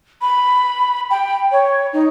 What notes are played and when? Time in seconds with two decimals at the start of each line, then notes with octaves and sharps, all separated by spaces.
0.21 B5
1.10 G5
1.51 C#5
1.93 D#4